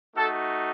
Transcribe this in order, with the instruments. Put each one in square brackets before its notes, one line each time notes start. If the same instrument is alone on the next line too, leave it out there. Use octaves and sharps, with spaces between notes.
[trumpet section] A3 D#4 F#4 A4